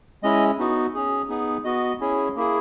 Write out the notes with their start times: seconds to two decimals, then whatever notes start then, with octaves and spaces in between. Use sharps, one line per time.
0.23 G#3 C#4 E4 D#5
0.59 B3 D#4 F#4
0.94 C#4 G#4
1.29 B3 D#4 G#4
1.65 B3 F#4 D#5
2.00 C#4 E4 G#4
2.36 A#3 E4 G#4